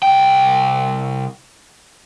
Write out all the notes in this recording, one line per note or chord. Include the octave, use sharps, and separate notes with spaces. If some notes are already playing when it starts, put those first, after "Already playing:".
C2 G5